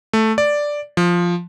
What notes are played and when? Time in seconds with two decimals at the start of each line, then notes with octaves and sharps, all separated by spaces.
0.13 A3
0.38 D5
0.97 F3